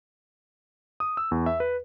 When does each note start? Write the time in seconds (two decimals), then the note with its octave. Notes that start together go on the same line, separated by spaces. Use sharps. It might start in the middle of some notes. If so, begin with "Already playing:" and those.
1.00 D#6
1.17 E6
1.31 E2
1.46 E5
1.60 B4